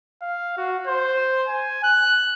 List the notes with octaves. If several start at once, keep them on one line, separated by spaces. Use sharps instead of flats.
F5
F#4
C5
G#5
F#6